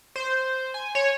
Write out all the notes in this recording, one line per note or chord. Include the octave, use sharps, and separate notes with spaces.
C5
G#5
C#5